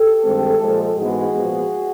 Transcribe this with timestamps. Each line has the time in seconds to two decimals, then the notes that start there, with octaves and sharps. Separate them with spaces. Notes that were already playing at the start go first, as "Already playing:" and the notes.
Already playing: G4 A4
0.24 G2 D#3 G#3 C4
0.61 A#2 F3 G#3
0.97 G#2 E3 G#3 B3 F#4 G#4
1.34 A#2 F3 G#3 B3